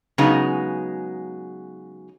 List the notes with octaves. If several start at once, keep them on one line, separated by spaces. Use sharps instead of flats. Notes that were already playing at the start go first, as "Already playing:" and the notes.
C#3 F#3 G#3 B3 D#4